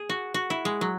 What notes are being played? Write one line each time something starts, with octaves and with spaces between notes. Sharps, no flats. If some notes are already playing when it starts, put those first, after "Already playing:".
Already playing: G#4
F#4
F#4
E4
G#3
F#3